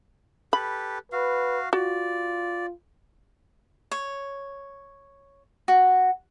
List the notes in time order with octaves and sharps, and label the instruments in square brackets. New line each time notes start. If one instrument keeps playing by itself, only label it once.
[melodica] G4 A4 B4 [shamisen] B5
[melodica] F#4 F5 [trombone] B4
[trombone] F4 [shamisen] F#4 [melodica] D5
[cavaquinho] C#5
F#4